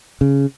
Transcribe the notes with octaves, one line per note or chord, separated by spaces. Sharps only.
C#3